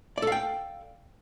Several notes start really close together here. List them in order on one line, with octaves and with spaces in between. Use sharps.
D5 A4 F5 G5